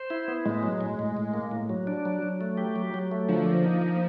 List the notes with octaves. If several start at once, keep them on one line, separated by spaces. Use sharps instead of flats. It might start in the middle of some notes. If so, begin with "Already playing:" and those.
Already playing: C5
E4
B3
A2 G#3
F#3
A2
A2
A2
A#3
A2
F#3
D4
F#3
F#3
A3
G4
F#3
F#3
A3
D3 F3
A#3
D#4
A#3